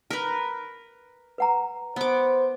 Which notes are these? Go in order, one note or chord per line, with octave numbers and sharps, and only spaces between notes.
A#4 B4
B4 F#5 A#5
B3 C5 D6